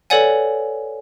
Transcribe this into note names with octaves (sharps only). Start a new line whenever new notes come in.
A4 B4 C#5 D5 F#5 G#5